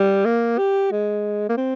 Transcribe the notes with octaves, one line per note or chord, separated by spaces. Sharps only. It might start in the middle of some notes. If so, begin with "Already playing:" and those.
Already playing: G3
A#3
G4
G#3
A#3
C4